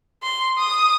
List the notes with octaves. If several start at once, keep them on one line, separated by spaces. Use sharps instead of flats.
C6
D#6